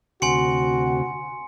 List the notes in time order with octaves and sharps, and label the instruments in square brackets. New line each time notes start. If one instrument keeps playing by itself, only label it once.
[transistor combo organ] D2 C3 [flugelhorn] F#4 [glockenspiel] G#5 C6 C#7